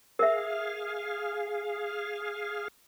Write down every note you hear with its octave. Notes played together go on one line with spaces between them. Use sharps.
G#4 A#4 E5 F5